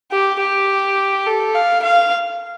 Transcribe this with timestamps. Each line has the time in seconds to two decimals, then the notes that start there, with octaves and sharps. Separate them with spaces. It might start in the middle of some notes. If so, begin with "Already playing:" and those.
0.12 G4
0.40 G4
1.26 A4
1.55 F5
1.83 F5